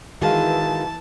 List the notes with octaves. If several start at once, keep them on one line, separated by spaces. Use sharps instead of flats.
D#3 E3 G#3 F#4 F5 A5